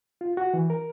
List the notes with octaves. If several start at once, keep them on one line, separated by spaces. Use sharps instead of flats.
F4
F#4
E3
A#4